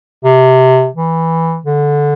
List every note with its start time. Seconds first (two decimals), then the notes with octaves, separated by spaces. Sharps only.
0.24 C3
0.95 E3
1.66 D3